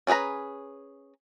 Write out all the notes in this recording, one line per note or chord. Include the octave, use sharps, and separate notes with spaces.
C#4 D4 G#4 B4 A#5